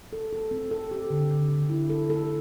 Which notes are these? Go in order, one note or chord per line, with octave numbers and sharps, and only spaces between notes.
A4
A4
C4
A4
G4
D3
D3
D3
E4
A4
A4